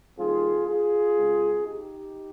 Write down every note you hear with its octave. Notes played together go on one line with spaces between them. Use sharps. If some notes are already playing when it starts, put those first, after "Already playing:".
D#2 D#3 G3 C4 F4 G#4
F4 G#4
C#2 C#3 G#3 C4
D#4 G4